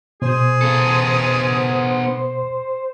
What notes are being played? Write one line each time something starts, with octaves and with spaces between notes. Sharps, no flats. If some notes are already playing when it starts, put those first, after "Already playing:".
B2 G#4 C5
B3 A4